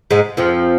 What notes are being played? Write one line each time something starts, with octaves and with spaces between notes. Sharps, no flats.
G#2 G#3
F2 F3